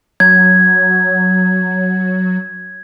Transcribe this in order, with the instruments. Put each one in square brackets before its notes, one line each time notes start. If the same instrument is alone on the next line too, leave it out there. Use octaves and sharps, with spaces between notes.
[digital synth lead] F#3 [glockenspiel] G#6